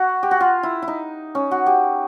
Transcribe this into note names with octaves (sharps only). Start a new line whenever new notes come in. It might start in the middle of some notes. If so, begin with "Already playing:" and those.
Already playing: F#4
G4
F#4
F4
E4
E4
D#4
C#4
F#4
G4